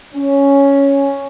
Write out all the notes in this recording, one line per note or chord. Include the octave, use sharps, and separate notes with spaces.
C#4